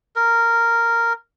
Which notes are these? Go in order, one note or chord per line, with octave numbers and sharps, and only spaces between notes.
A#4